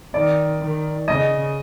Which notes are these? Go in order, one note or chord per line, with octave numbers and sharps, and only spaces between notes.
D#3 D5
D#3
C#3 D#5